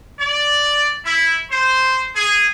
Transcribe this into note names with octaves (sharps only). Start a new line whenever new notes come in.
D5
E4
C5
G#4